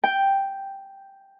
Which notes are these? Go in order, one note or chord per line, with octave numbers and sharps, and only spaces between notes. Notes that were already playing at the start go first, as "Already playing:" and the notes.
G5